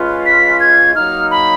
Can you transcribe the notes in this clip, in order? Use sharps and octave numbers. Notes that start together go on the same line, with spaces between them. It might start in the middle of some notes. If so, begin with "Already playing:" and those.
Already playing: G#3 C#4 F4 B4
B6
G#6
F#3 A#3 D#4 F6
B5